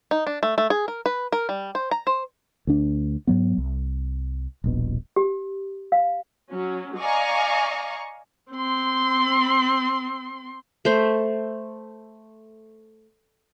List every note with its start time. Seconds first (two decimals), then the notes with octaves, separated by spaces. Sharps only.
0.11 D#4
0.27 D4
0.43 A3
0.58 A3
0.70 G#4
0.88 A#4
1.06 B4
1.32 A#4
1.49 G3
1.75 C5
1.91 A#5
2.07 C5
2.67 D2 D4
3.27 G#2 F#3 B3
3.58 C2
4.64 D#1 A#1 B2
5.16 G4
5.92 F5
6.52 F#3 C#4
6.98 D5 D#5 F5 G#5 A#5 C#6
8.52 C4 C6
10.85 A3 C5 E5